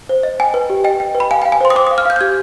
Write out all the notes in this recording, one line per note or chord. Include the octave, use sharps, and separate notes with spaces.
C5
D#5
G5 G#5
B4
G4
D#5 G5
G5
B4
B5
F5 G#5
G5
F5
G#5
C5 C6
D#6
C5 D6
D#6
F5
F6
F5 G6
G6
G4 G#6